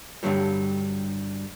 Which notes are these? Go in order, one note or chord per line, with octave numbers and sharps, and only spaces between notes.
G2 B2 D3 F#3 G3